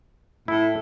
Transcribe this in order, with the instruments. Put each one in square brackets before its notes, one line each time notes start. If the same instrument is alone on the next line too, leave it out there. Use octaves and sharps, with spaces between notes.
[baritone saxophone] A2 [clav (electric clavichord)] E4